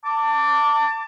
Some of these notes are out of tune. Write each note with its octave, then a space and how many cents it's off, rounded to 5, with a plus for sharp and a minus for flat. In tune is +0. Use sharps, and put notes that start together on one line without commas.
A5 +25 D6 -10